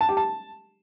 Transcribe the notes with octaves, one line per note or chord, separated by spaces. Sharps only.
A5
G4
A5